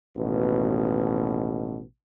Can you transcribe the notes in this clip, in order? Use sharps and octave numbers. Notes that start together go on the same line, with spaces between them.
A1 D#2 B2